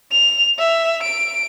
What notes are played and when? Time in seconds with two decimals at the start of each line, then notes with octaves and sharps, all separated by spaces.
0.12 F7
0.59 E5
1.03 D7